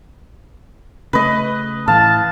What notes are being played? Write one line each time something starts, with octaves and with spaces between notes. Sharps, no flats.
C#3 A3 B4 D#5
A2 E3 F5 A5